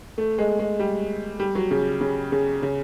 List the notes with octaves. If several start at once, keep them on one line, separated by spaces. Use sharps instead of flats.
A3
G#3
G#3
G3
G3
F#3
C#3
C#3
C#3
C#3